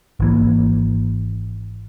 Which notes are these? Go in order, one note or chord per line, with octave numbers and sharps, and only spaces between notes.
G#1 E3 A#3